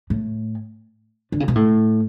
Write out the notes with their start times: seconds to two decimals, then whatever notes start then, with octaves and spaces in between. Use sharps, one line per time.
0.10 A2
1.32 D3
1.40 C#3
1.48 B2
1.55 A2